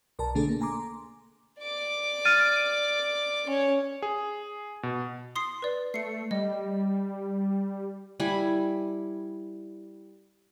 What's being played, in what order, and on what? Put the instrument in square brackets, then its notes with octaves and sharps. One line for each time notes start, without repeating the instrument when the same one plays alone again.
[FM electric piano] B1 A#4 D5 A5
B2 D3 A3 D4 G#4 A4
A#3
G#5 A#5 C6 D6
[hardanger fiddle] D5 D6
[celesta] F6 A6 D#7
[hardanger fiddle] C#4 C#5
[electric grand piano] G#4
B2
[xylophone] C6 D#6 C7
B4 D5
[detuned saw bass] A3 [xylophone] C7 C#7
[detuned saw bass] G3 [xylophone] D#5
[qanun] G3 E4 G#5 B5